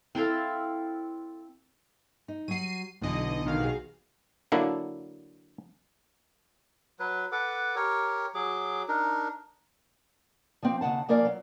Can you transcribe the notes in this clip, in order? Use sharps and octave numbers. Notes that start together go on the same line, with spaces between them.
C4 E4 A4 F5
D#4
F#3 F#4 C7 D#7
B1 D3 E3 B3 D#5
B1 D#3 F5
F#4 G#4
D3 F#3 A#3 D4 E4
F#3 B4
A4 B4 F#5 D6
G4 A#4 C#5
F#3 G#4 D6
D4 D#4 A#4
F3 A#3 C4
D#2 C#3 B3 F#5 A5
F3 A#3 C#4 A#4 D5 F5
F#3